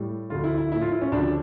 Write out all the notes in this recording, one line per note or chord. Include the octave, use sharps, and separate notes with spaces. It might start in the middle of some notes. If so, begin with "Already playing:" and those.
Already playing: A2 G3
D2 D3 F3 F4
E4
E4
A2 F3 E4
F4
E4
C#4
D2 C#3 F3 D4